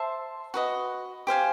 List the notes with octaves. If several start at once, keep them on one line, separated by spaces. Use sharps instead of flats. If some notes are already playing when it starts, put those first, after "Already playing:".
Already playing: C5 E5 A5 C6
F#4 B4 D#5
G4 C5 F5 G#5